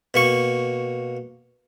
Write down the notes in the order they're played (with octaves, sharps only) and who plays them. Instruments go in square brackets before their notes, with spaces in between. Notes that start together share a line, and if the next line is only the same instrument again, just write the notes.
[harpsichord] B2 A#3 C#6